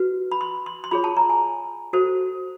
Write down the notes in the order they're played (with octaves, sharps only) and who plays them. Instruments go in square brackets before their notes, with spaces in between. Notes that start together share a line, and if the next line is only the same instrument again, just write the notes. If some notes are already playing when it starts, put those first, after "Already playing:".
Already playing: [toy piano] F#4 B4
B5
C6
C6
C6
F4 G#4 C#5 B5
A5
A#5
G#5
F#4 A4 C5